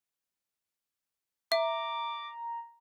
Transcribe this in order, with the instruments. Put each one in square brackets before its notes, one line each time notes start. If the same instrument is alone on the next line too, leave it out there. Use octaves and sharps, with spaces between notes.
[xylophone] E5 [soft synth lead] A#5 [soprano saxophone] D6